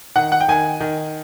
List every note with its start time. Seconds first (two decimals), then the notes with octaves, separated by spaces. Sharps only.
0.16 D#3 F#5
0.32 F#5
0.41 G5
0.48 D#3 G#5
0.80 D#3